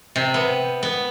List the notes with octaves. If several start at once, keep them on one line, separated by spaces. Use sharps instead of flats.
C3
B3
B3